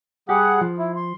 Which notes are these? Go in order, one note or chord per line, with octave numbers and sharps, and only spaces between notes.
G3 G4 G#4 F#5
F3
E4
C6